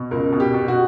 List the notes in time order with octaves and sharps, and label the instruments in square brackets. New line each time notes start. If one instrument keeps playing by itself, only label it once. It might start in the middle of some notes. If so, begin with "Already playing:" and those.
Already playing: [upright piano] B2
C#2 A#4
B2
G4
B2
F#4